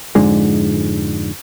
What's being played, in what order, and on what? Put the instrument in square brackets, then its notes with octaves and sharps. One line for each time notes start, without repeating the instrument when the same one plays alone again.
[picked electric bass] F2 G#2 D3 G#3